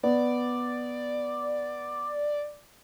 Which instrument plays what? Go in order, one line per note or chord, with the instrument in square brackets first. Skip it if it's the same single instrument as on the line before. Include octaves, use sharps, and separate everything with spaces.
[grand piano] B3 [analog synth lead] D5